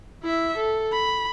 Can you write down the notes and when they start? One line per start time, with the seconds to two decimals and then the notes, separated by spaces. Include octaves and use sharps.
0.23 E4 E5
0.58 A4
0.92 B5